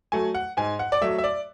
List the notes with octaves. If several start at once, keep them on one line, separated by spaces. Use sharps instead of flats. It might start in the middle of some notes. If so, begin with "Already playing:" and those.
F#3 A3 G#5
F#5
G#2 G#5
F#5
D5
F#3 A3 E5
E5
D5